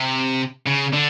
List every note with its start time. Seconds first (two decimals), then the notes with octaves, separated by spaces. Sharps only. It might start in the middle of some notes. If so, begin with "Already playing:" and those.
Already playing: C3
0.66 C#3
0.93 D3